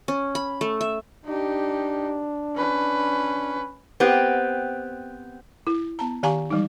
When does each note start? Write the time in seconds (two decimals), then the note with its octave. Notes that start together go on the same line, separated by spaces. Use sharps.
0.08 C#4
0.35 B5
0.61 A3
0.81 E5
1.26 D4 D#4 G4
2.56 C#4 B4
4.00 B3 C4 G4
5.67 E4
5.99 B3 A5 A#5
6.23 D#3 G4 F5 G#5 A#5 C#6
6.50 E3 G3 G#3 D#4